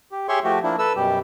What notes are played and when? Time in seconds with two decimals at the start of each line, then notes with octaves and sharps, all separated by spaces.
0.12 G4
0.28 G4 G#4 C#5 E5 C6 C#6
0.44 F3 A3 F#4 G4
0.63 F3 A#3 D4 E4
0.79 A4 B4 E6
0.96 F#2 B2 G3 G4